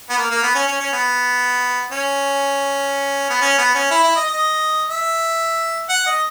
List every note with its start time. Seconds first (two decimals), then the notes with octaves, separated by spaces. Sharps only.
0.10 B3
0.18 A#3
0.30 A#3
0.43 B3
0.55 C#4
0.68 C#4
0.80 C#4
0.92 B3
1.92 C#4
3.30 B3
3.41 C#4
3.58 B3
3.75 C#4
3.91 E4
4.03 E4
4.16 D#5
4.27 D#5
4.90 E5
5.89 F#5
6.06 D#5